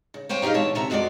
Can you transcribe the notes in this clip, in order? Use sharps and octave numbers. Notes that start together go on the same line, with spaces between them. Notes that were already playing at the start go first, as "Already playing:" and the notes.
C#3
A#3 C5 C#5 G5 G#5
D#4 G4 G#4 D#5 F5
G2 B2 E3 G#3 C#5 A5
D2 C3 A3 E5 A#5
F2 F3 G#3 F#4 B4 D5